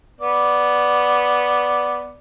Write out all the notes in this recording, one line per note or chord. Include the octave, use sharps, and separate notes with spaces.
B3 D5